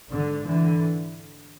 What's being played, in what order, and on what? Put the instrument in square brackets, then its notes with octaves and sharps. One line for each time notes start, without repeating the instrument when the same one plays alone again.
[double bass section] G#2 D3
D3 E3